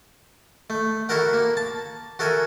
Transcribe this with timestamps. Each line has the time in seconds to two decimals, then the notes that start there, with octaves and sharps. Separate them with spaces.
0.70 A3
1.09 E4 F#4 A4 A#4 F#5
1.34 A#3
1.57 A5
2.19 F#4 A4 A#4 E5 G#5